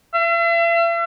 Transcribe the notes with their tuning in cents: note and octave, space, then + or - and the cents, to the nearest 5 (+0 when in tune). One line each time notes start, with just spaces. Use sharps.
E5 +45